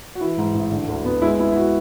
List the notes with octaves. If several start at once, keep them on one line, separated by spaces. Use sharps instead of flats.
F#4
E3 E4
G#2
A1
D3
D2
B3
G#3 E4
B3 E4
E4
F#4